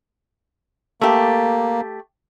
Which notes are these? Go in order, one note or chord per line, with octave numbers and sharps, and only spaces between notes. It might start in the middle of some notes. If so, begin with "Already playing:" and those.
A3 A#3 G4